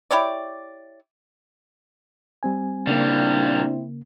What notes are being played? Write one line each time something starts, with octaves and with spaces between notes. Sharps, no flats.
E4 G4 C#5 D5
G3 C4 G#5
A#2 C#3 G3 A#3 C4 D4 E4